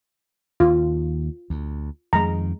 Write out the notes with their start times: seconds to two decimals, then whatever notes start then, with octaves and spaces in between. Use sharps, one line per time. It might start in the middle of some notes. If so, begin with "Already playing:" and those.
0.60 D#2 F4
1.50 D2
2.13 F2 D#3 G#3 A#5